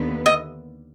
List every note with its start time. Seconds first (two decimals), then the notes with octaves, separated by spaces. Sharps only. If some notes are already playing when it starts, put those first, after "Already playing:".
Already playing: D#2 D3 B3
0.26 D#5